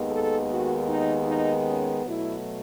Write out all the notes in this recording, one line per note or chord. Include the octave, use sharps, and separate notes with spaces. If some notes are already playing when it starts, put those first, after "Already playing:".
Already playing: D#2 D#3 G#3 B3
A4
F#4
D#4
D#4
C#4
B2 F#3 A3 E4